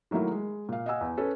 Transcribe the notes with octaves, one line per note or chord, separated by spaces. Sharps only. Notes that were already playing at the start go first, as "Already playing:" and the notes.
D#3 F#3 A3 A#3 E4
G#3
A#2 F5
D#5 F5 F#5 G#5 E6
E2
C#4 A4 B4